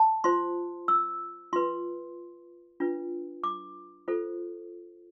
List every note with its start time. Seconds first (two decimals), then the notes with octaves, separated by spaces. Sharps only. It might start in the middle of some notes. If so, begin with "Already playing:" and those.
Already playing: A5
0.24 F4 C5 C6
0.88 E6
1.53 F4 B4 C6
2.80 D4 F4 B4
3.44 D6
4.08 F4 A4 C5